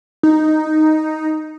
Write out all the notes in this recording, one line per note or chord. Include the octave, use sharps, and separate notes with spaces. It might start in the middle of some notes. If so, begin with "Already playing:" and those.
D#4